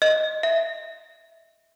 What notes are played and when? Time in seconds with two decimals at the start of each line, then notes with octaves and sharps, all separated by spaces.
0.02 D#5
0.43 E5